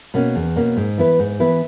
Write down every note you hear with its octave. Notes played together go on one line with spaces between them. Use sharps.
B2 A#3 C#4
E2
B2 A#3 C#4
G#2
E3 B3 E4 B4
G#2
E3 B3 E4 B4